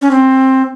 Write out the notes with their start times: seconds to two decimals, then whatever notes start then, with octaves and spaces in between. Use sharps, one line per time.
0.02 C#4
0.11 C4